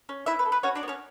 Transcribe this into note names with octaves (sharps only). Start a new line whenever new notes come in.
C#4
B3 E4 E5
B4
A4
B4
C#4 F#4 C#5
D4 D5
B3
C#4 C#5